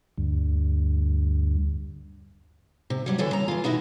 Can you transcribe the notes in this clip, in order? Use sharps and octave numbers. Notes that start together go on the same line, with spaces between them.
D2 G2
C3
F#3 G3 G4
D3 E3 G3 F#4 A4 C#5
C#3 A#5
E3 F4
B2 D#4 E4 F#4